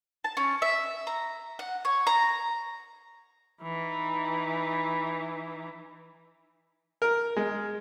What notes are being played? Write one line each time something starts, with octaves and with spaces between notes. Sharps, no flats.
A5
C#4
E5
A#5
F#5
C#5
A#5
E3 D#4
A#4
G#3